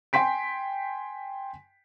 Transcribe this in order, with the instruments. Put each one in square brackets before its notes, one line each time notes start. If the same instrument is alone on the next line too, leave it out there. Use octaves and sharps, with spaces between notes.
[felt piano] G5 G#5 C6 B6 D7